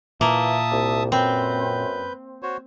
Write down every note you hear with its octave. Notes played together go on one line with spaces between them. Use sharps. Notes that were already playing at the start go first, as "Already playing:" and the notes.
A#2 E3 A#3 E5 A5 D#6
C2
F#2 C4 B4 G6
F#4 C5 C#5